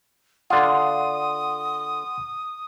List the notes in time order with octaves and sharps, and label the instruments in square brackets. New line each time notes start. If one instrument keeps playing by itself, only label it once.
[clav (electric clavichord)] D3 F4 [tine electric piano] F#5 C6 [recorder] D#6